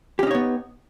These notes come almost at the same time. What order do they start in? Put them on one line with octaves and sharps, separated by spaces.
G4 C#4 D#4 C#5 B3